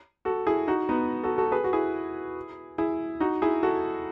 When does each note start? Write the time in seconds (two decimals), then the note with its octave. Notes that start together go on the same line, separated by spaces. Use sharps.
0.25 F#4 A4
0.47 E4 G#4
0.68 D#4 F#4
0.89 B3 D#4
1.24 F#4 A4
1.38 F#4 A4
1.52 G#4 B4
1.64 F#4
1.73 E4 G#4
2.78 E4 G#4
3.20 D#4 F#4
3.42 E4 G#4
3.63 F#4 A4